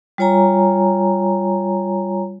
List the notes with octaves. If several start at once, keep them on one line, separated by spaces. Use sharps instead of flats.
G3 F4 C#5 G#5 A#5